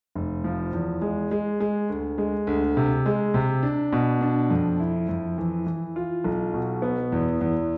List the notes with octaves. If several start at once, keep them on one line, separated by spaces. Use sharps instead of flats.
F1
F3
E2
G#3
G#3
G#3
D2
G#3
D2
C3
G#3
C3
D4
B2
D4
F2
E4
F2
E3
E3
F4
B1
B2
B3
E2
E2